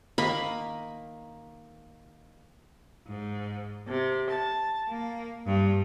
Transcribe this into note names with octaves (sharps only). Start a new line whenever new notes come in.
D#3 A#3 B5
G#2
C3
A5
A#3
G2